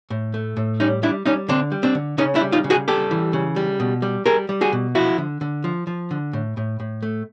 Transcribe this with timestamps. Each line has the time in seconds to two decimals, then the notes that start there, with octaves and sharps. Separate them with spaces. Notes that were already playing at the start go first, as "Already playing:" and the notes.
0.10 A2
0.34 A3
0.57 A2
0.80 G3 C#4 D#4
1.03 G3 D4 E4
1.26 G3 C#4 D#4
1.48 D3 C4 D4
1.72 G3
1.83 C4 D4
1.95 D3
2.18 C#3 C#4 D#4
2.35 D4 E4
2.41 G3
2.52 D#4 F4
2.64 C#3
2.70 F#4 G#4
2.88 G3 G4 A4
3.11 E3
3.33 C#3
3.56 G3
3.80 B2
4.02 G3
4.26 G3 G#4 A#4
4.49 G3
4.61 F#4 G#4
4.73 B2
4.95 F3 E4 F#4
5.18 D3
5.41 D3
5.64 F3
5.87 F3
6.11 D3
6.33 A2
6.57 A2
6.80 A2
7.03 A3